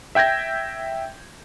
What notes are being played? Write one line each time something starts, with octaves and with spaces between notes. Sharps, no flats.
E5 G5 G6 G#6 A#6